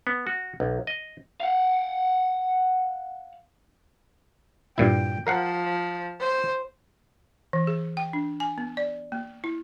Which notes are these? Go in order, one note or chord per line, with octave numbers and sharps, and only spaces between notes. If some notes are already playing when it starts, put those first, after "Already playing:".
B3
F#4
B1
D#5
F5 F#5
G2 A#2 E4 G5
F3 A#4 F5 F#5
C5
E3
G#4
G5
D4
G#5
B3
D5
A#3
E4